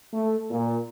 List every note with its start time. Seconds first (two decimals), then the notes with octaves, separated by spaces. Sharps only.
0.13 A3
0.50 A#2